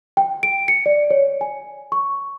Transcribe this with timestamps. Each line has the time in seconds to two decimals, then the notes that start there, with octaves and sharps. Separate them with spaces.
0.17 G5
0.43 D7
0.68 C#7
0.86 D5
1.11 C#5
1.41 G#5
1.92 C#6